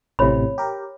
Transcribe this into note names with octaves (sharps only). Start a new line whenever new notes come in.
A1 A2 C3 C#5 B5
G4 A#4